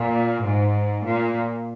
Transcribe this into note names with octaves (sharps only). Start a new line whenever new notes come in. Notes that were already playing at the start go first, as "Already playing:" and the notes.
Already playing: A#2
G#2
A#2